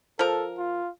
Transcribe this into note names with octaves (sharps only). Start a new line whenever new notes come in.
F3 A4 A#4
F4